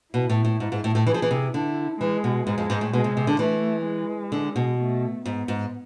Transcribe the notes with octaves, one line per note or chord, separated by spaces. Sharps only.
B2 E4
A2
A2
G#2
G#2
A2
A2
E3 G#4
F3
E3
C3
D3 E4
E3 G#3
B2
G#2 G#3
F2
G#2
A2
B2 G#3
C3
C3
D3
E3 A3
G#3
D3
B2
A3
G#2 B3
G#2